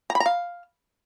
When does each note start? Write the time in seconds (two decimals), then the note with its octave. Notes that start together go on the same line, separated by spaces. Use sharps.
0.10 A#5
0.15 B5
0.20 A#5
0.26 F5